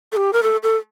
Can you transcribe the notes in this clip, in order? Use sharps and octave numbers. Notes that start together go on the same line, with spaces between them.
A4
G4
A#4
A4
A4